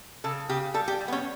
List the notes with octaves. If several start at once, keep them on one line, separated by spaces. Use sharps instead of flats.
C#3 A4
C#3 G4
G3 A4
G4
G3
B3
C#4